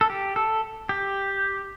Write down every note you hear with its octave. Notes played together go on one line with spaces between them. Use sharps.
A4
G4
A4
G4